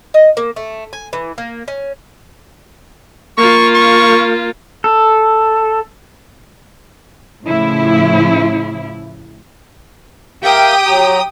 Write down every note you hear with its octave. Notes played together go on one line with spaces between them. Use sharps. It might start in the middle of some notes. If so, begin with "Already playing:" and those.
D#5
A#3
A3
G#5
E3
A#3
C#4
A#3 F4 C#6
C#6
A4
A2 C#3 F3 E4
G4 A#4 E5 F5 G5 D#6
F#3 A#5